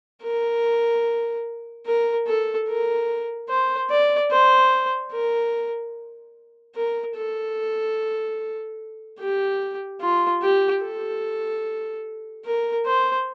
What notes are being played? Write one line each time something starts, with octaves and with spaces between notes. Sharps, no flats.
A#4
A#4
A4
A#4
C5
D5
C5
A#4
A#4
A4
G4
F4
G4
A4
A#4
C5